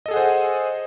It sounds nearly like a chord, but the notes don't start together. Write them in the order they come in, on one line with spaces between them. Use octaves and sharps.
D#5 A4 G#4 F#5 C5